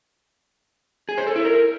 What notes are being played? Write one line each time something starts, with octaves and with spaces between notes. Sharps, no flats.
G#4
C5
A4
E4
A#4